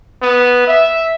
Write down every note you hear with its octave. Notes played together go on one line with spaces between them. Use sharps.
B3
E5